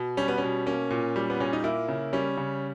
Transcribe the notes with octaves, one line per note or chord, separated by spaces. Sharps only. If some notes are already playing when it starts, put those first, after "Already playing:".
Already playing: B2
G3 C#4
B3
B2 C#4
A#3 C#4
A#2
G3
B3
A#2 C#4
D#4
A#3 E4
C#3
G3 C#4
C#3